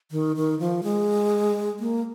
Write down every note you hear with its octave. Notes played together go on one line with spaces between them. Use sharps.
D#3
D#3
F3
G#3
A#3